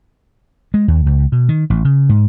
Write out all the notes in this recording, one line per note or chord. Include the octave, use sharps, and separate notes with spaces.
G#3
D#2
C#2
B2
D#3
A1
C#3
G#2